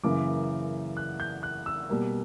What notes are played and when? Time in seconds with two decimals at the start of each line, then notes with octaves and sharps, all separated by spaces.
0.04 F#2 C#3 E3 A#3 D6
0.97 F#6
1.20 G6
1.43 F#6
1.66 E6
1.89 B2 G3 A#3